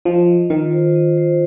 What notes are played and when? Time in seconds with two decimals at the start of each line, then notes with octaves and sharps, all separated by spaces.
0.05 F3 D#5
0.28 D#5
0.50 D#3 F4
0.73 C5
0.95 D#5
1.18 C5